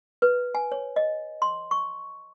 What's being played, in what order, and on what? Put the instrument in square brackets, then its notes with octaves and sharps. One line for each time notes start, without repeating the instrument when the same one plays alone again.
[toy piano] B4
G#5
C#5
D#5
C6
C#6